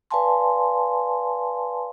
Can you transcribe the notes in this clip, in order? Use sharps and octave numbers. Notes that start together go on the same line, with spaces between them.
B4 D5 F5 G#5 A5 C6